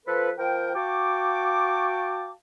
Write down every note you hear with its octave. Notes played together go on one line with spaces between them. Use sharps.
F3 A4 B4
F3 A#4 G5
F#4 F5 G5 A5 C#6 D6